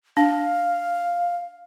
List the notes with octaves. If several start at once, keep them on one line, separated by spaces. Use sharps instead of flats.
D4 F5